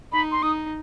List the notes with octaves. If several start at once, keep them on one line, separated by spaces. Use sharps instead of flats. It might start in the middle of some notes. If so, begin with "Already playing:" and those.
D#4 B5
C6
D#4 D#6